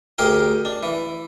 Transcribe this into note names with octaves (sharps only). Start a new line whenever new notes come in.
D2 G4 G#4 A#4 G5
D4
E3